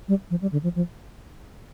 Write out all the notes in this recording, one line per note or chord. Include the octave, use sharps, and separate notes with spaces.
G3
F3
G3
D3
F3
F3